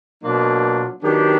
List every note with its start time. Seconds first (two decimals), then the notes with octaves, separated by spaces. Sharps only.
0.22 B2 F#3 A#3 D4 F4
1.02 D#3 F#3 B3 D4 G4